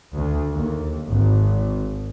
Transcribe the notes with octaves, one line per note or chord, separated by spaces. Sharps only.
D2
D#2
G#1